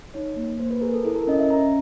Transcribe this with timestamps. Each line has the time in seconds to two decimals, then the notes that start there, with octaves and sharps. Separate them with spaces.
0.14 D#4 C#5
0.36 A#3
0.60 A#3 C5
0.71 B4
0.81 G#4 A#4
0.94 A4
1.05 E4 A4
1.16 A#4
1.27 C#4 D#5
1.39 E5
1.50 C#4 A#5